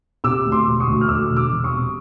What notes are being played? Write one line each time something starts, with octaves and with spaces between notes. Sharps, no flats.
C3 D6 E6
D2
C6 D6
E1
C#6 D#6
D2
F6
D2 D6 E6
E1
D6 E6
E1
C#6 D#6
C3